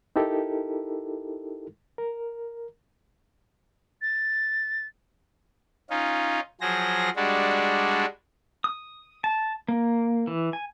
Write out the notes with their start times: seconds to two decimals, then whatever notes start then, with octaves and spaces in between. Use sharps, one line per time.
0.16 D#4 E4 G4 A4 A#4
1.98 A#4
4.02 A6
5.90 C#4 D#4 F4
6.61 F3 F#3 G#4 C5 A#6
7.16 G3 G#3 D4 F#4
8.64 D#6
9.24 A5
9.68 A#3
10.27 E3
10.53 G#5